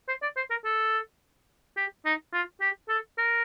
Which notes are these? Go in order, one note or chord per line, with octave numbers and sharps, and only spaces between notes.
C5
D5
C5
A#4
A4
G4
D#4
F4
G4
A4
A#4